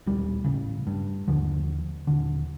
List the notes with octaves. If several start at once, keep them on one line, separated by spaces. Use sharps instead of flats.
D#1 B1 G3
A1 C#3
G2
D#2 D3 F3
D#1 D3